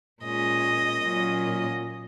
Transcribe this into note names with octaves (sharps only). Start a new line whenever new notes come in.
A#2 G#3 C#4 D#5
A#2 F#3 A#3 C#4